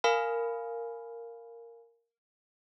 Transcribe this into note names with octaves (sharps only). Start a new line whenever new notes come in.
A#4 F5 G#5 B5 F6